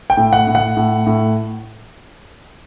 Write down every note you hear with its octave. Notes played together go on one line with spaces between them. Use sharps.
G5
A2
F#5
A2
F#5
A2
A2